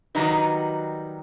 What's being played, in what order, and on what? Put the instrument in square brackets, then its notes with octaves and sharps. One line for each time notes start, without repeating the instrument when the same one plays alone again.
[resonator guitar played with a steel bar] D#3 F#3 G3 D#4 F#4 B4